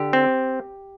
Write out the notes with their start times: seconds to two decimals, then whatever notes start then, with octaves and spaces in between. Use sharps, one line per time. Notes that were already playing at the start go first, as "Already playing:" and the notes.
Already playing: D3 G4
0.13 C4